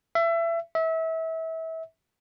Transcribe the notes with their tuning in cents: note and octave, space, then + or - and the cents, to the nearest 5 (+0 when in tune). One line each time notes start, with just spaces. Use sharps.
E5 +25
E5 -30